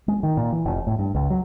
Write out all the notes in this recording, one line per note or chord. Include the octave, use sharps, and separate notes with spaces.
G#3
D#3
A#2
E3
F1
A2
G2
C#2
F#3